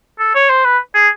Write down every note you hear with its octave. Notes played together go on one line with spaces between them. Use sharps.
A4
C#5
C5
B4
G#4